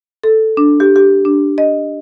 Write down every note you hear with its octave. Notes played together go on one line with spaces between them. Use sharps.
A4
D4
G4
G4
D4
D#5